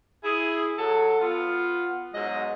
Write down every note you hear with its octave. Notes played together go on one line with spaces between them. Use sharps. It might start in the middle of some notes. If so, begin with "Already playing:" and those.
E4 G#4
F#3 A4
B3 F4
G#2 B2 F#3 G#3 D#5